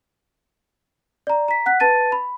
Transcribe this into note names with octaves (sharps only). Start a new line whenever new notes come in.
D5 A#5
A#5 B6
F#5 F#6 B6
B4 A5 A6 D#7
B5